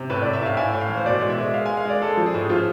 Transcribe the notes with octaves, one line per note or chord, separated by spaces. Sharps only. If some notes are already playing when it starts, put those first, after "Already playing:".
Already playing: C3
A2 B4
D5
A2
E5
A2 F5
A2 G#5
A2
F5
E3
C5
B2 D5
G#3
E5
G#3
G#3 F5
G#5
G#3
F5
G#3 D5
G#3 A4
F3
G#4
A2
F3 F4